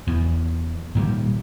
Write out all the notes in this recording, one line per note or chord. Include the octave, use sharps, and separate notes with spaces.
E2
A#2 D#3 G3